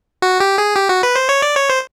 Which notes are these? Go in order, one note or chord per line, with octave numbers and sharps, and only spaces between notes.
F#4
G4
G#4
G4
F#4
B4
C5
C#5
D5
C#5
C5